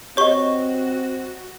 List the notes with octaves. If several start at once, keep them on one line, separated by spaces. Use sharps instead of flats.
C4 F#4 G4 C#5 D#5 C#6